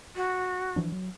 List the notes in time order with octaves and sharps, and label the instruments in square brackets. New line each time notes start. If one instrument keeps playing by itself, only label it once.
[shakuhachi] F#4
[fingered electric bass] E3 F3 D4
F#3